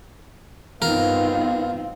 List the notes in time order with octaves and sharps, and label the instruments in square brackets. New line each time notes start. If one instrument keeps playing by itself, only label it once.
[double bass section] G2 B3 [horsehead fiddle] C4 D#4 [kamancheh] F4 [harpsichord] A#4